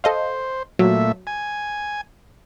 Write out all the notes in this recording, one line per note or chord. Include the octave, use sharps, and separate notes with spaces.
A4 C5 D#5 F5
A#2 F#3 A3 E5
G#5